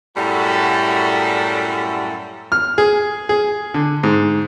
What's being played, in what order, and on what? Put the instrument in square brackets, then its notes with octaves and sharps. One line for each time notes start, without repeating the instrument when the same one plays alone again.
[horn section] F#2 A2 G3 F#4 A4
[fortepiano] F6
G#4
G#4
D3
G#2